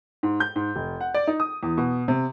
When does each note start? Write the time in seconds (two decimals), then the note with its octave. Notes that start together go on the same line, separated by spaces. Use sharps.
0.23 G#2
0.40 G6
0.56 G#2
0.76 F1
1.01 F#5
1.14 D5
1.27 D#4
1.40 D#6
1.63 E2
1.78 B2
2.08 C3